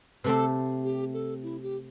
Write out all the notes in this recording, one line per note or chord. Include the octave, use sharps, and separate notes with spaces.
C3 A3 C4 A4 B4
G4
A4
E4
G4